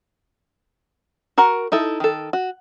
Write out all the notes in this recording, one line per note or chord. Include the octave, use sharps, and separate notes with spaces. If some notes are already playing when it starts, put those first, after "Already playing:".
F#4 A#4 F#5
D#4 E4 A4
D#3 A4
F#4